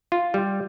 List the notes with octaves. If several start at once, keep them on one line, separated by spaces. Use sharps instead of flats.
F4
G3